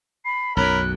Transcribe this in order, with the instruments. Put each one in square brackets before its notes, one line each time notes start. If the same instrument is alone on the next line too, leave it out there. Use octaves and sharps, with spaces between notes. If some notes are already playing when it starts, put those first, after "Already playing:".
[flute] B5 [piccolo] C7
[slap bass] B1 F#2 [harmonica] A#4 B5 [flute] C#5 [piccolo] F#6